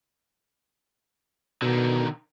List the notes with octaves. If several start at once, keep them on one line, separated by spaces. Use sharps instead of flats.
B2 D3 D#3